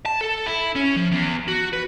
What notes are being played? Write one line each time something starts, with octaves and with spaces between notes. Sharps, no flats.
A5
A4
E4
C#4
F3
E2
F#4
B4